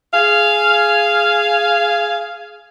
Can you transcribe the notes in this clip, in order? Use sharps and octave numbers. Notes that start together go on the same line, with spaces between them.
G#4 F5